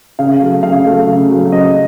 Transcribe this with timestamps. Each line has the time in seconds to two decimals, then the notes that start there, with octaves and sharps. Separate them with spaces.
0.19 C#3 F5
0.41 F#3 A3
0.63 C#3 F5
0.85 F#3 A3
1.07 C#3
1.29 F#3 A3
1.52 C#3 D#5